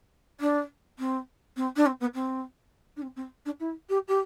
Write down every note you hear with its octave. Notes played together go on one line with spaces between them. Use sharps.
D4
C4
C4
D4
C4
B3
C4
D4
C4
C4
D4
E4
G4
G4